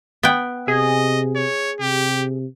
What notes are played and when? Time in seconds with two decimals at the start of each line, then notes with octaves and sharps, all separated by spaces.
0.23 B3 G5
0.68 C3 G#4 D#5
1.36 C#5
1.80 C3 G4